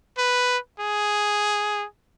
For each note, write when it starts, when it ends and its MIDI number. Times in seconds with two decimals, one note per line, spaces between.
0.18 0.58 71
0.80 1.86 68